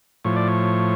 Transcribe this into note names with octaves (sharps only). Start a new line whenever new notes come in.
A2 F3 C#5
D5
C#5